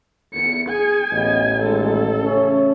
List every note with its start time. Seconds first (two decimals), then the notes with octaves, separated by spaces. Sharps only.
0.34 E2 C#7
0.69 G#4 G#5
1.12 A1 D2 B3 D#5
1.62 A#2 D#3 G#3 A4
2.23 C#3 A3 C#4 C#5